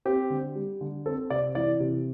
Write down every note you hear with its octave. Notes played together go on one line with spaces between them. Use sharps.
C4 G4
D3
G3
D3
C4 A4
C3 D5
E3 D5
C3